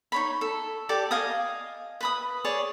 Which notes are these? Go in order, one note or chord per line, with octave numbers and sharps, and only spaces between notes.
D#4 C#5 B5
A4
G4 A4 D5 D6
D#5 F5 G#5 D#6
B4 B5 D#6
G#4 C#5 D5